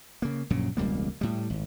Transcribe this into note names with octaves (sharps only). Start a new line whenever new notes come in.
C#3 A#3
A#1 F#2 A#2 C#3
E1 C#2 G3 A#3
A2 G3
G#1